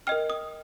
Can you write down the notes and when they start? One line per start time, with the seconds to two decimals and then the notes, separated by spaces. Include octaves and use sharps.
0.07 A#4 D#5 G5 F6
0.30 D#6